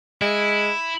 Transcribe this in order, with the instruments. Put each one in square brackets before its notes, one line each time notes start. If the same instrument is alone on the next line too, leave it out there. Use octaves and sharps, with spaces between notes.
[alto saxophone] G#3 [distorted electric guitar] E4